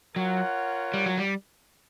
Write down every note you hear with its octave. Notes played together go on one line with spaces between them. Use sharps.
F#3 F4 A#4 C#5 F#5
G3
F#3
G3